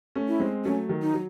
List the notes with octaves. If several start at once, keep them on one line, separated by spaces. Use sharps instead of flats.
A3 C#4
E4
G#3 C4
F#3 A3 C#4
D#3 F#3
D#4
F#3